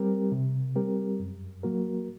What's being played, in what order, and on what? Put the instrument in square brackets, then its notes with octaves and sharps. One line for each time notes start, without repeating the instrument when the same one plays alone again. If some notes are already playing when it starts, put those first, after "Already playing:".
Already playing: [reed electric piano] G3 C4 G4 A#4
C3
G3 C4 G4 A#4
F#2
F#3 A#3 F#4 A#4